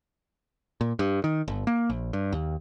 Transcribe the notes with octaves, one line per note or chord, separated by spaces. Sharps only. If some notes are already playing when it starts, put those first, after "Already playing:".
A#2
G2
D#3
G1
A#3
A#1
G2
D#2